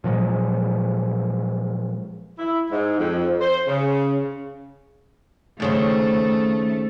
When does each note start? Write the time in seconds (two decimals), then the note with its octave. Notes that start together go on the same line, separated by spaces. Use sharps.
0.04 A#2 F3 F#3 G#3
2.38 E4
2.70 G#2
2.98 F2
3.40 C5
3.67 C#3
5.60 D#2 C#3 A3 C4